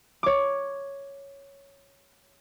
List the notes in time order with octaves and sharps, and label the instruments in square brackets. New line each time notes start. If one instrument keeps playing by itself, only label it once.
[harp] C#5 D6